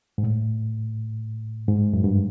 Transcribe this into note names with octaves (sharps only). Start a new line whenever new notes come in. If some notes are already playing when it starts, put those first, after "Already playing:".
G#2
A2
G#2
F#2
G2